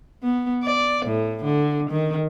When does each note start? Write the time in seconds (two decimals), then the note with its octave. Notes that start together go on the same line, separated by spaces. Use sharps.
0.23 B3
0.63 D5
1.06 A2
1.44 D3
1.90 D#3